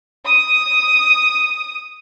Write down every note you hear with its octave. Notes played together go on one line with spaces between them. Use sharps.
D#6 D#7